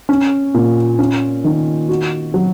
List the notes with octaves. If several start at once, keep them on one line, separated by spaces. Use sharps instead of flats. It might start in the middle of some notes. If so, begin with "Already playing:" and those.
C#4
A#2
C#4
D#3
F#4
F#3